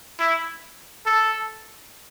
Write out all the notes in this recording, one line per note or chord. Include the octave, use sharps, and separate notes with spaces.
E4
A4